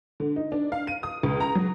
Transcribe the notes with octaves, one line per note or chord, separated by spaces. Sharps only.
D3
D#4
D4
F5
D#7
D#6
C#2
A#5
F#3